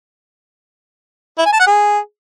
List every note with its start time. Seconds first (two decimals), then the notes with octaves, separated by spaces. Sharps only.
1.38 E4
1.46 G#5
1.53 A5
1.60 F#5
1.67 G#4